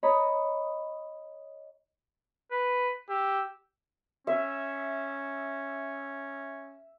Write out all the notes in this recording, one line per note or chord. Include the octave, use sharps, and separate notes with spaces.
C#5 D#5 A#5 B5 D#6
B4
G4 E6
C#4 E5